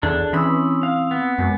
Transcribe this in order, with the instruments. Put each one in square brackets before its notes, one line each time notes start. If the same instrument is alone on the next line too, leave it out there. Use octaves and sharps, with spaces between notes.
[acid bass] E2 [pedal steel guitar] D4 A4 [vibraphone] G#4
[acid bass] E3 [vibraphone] C4 D#6 E6 [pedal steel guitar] C#4 B5
[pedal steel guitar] F5
B3
[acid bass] F#2 [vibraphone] G#3